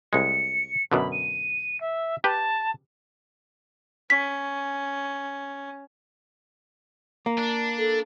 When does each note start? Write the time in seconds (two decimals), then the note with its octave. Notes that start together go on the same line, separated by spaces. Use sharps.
0.13 C2 G#3 C#7
0.92 F#2 B2 D3 B5
1.12 D#7
1.81 E5
2.24 G4 B4 A5
4.10 C#4 B6
7.26 A#3
7.38 D4
7.78 A4